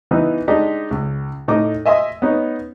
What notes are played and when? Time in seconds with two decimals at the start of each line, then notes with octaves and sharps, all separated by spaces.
0.11 E3 B3 D#4
0.48 G#3 D4 D#4 G4
0.91 C#2
1.48 A2 D#4 D6 D#6
1.86 D#5 E5 G#5 C6 D#6
2.22 B3 C#4 D#4